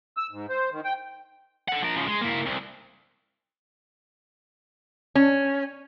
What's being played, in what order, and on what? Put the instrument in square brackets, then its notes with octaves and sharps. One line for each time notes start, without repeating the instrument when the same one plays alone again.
[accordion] E6
G#2
C5
D#3
G5
[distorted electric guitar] A4 F#5
F3 A#4
C#3 F3
G#3
A#3 E4
C2
[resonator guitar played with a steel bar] C#4